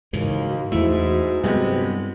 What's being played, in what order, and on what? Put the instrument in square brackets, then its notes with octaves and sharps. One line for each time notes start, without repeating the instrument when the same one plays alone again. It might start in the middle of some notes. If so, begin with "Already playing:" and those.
[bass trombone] D#2 [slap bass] G#2 C#3 E3 [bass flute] F#4
[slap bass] E2 A3 [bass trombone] G#2 [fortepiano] E4
[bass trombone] C2 [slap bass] G2 F#3 [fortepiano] C3 G#3 B3